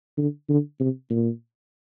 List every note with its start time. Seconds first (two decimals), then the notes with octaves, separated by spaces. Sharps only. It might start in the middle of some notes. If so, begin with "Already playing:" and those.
0.18 D3
0.49 D3
0.80 C3
1.10 A#2